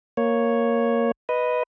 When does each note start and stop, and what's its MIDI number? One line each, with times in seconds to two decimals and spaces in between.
0.17 1.11 58
0.17 1.11 73
1.29 1.63 71
1.29 1.63 75